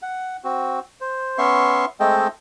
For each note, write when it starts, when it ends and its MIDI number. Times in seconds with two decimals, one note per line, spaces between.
0.02 0.37 78
0.44 0.79 60
0.44 0.79 66
1.01 1.38 72
1.38 1.85 59
1.38 1.85 61
1.38 1.85 76
1.38 1.85 84
1.38 1.85 85
2.00 2.28 56
2.00 2.28 57
2.00 2.28 60
2.00 2.28 69
2.00 2.28 75
2.00 2.28 79